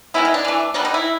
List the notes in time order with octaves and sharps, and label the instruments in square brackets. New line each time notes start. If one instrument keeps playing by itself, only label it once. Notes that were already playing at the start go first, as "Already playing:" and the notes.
[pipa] D#3 G#3 B3 E4
D#4
D4
E3 A3
D#3 G3 B3 D4
D#4
E4